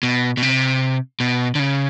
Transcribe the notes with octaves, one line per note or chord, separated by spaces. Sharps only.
B2
B2
C3
B2
D3
C#3